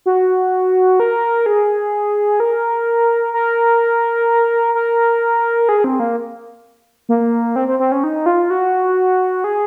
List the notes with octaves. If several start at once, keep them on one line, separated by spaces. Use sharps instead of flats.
F#4
A#4
G#4
A#4
A#4
A#4
G#4
C4
A#3
A#3
C4
C4
C4
C#4
D#4
F4
F#4
G#4